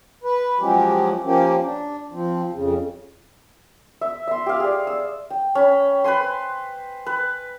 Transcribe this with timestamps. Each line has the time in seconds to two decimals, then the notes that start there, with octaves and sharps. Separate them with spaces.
0.24 B4
0.60 F3 F#3 G#3 C#4 G4
1.23 F3 A#3 C#4 G4
1.63 D4
2.12 F3 C4
2.53 F2 C#3
4.01 E5
4.28 E5 C6
4.46 G4 F5
4.60 G#4 D5
4.87 E6
5.30 G5
5.55 C#4 B5
6.04 B4 C5 G#5 C6
7.06 B4